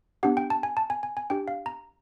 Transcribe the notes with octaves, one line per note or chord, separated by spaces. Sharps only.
B3 D4 G4 F#5
G5
A5
G#5
A5
G#5
G#5
G#5
D4 G4 G5
F5
A#5